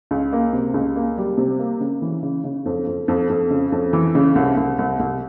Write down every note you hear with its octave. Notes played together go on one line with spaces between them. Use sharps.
C#2
A#3
C3
C#2
A#3
G3
C3
A#3
C#3
E3
C#3
C#3
F2
F2
F2
F2
C#3
F2
E3
C#3
C2
C2
C2
C2